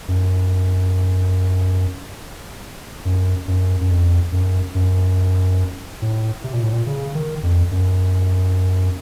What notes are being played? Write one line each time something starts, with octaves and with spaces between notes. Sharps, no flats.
F#2
F#2
F#2
F#2
F2
F#2
F#2
A2
C3
A#2
A2
A#2
C#3
D#3
F2
F#2